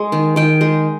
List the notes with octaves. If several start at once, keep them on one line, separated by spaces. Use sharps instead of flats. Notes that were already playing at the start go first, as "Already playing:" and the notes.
Already playing: G#3
D#3
D#3 G5
G#3